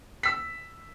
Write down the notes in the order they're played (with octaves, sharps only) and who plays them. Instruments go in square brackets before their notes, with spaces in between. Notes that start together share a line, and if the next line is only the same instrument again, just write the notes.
[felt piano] E6 B6